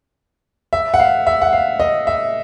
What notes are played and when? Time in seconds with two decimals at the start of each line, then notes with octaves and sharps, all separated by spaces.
0.73 E5
0.94 F#5
1.00 F5
1.27 E5
1.41 F#5
1.53 F5
1.79 D#5
2.07 E5